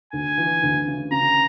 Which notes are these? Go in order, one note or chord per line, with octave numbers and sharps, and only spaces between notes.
D2 G#5
E3
D2
C#3
C#3 A#5